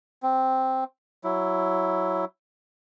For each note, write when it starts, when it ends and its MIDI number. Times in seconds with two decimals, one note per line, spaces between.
0.23 0.84 60
1.24 2.25 54
1.24 2.25 64